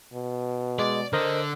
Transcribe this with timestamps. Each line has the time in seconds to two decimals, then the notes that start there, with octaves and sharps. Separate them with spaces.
0.13 B2
0.79 G#3 D5
1.13 D3 A#4 C5 D#5